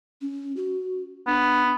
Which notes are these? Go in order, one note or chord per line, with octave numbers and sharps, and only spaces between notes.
C#4
F#4
B3 D4